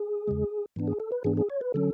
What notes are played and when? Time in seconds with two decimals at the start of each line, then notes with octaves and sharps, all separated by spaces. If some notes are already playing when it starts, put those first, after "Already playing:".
Already playing: G#4
0.28 E2 C#3 G#3
0.76 G#2 E3 B3 D4
0.87 G#4
1.00 A4
1.12 B4
1.24 G#2 E3 B3 D4 G#4
1.37 G#4
1.50 C#5
1.61 B4
1.74 D3 F#3 C#4 A4